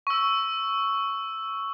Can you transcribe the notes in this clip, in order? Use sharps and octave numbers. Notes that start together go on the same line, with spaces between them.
C#6 E6